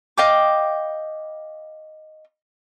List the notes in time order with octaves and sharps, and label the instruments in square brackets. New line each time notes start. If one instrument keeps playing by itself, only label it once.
[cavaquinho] D#5 F5 G5 D6